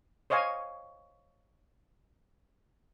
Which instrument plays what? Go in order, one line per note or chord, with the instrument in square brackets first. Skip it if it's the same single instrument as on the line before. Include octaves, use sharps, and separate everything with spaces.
[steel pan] C5 C#5 D#5 F5 G#5